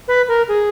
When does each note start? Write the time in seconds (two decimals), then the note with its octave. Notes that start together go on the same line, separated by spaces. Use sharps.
0.08 B4
0.28 A#4
0.48 G#4